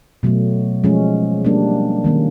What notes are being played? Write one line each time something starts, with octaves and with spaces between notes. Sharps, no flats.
B2 F#3 A3
F3 G#3 C#4
G3 A#3 D4
D#3 G3 A#3 C#4